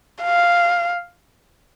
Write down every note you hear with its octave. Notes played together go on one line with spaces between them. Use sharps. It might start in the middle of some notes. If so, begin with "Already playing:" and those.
F5